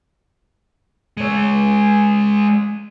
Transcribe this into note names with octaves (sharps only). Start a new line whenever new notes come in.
G#3 C#5